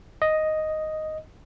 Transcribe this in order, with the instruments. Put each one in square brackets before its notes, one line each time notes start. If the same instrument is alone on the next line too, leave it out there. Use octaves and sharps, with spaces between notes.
[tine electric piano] D#5